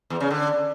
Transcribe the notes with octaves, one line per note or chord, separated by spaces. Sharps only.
E2
C#3
D3